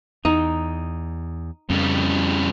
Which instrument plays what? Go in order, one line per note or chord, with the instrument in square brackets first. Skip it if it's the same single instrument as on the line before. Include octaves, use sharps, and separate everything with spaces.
[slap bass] E2 [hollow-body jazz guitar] D#4
[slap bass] F2 [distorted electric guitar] C#3 G3